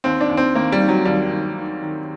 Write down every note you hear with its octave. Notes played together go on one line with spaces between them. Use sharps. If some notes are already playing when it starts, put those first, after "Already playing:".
D#2 C4
D4
D#2
C4
D#3 A#3
G3
D#3
F#3
D#2 G3
D#2
D#3
D#3